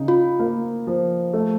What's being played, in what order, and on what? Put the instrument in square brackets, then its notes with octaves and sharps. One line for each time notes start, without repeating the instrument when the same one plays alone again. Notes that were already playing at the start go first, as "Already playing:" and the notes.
Already playing: [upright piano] C#3 D#4
[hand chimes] F4
[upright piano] A#3
F3
A3